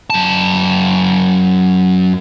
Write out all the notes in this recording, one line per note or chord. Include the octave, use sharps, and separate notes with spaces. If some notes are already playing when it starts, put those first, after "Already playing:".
F#2 A5